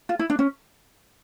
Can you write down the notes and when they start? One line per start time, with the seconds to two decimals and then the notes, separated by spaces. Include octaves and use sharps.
0.09 F4
0.19 E4
0.30 D4
0.39 C#4